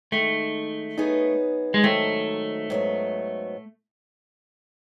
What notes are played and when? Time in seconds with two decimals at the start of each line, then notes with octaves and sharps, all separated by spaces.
0.12 D#3 G#3 A3 D#4
0.98 F#3 B3 D#4 G#4 B4
1.74 G#3
1.84 G#2 D#3 F#3 A3
2.70 G#2 F#3 B3